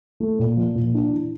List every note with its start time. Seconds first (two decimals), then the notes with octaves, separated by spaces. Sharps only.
0.20 A3
0.39 A#2
0.57 F3
0.75 A#2
0.94 D4
1.13 E3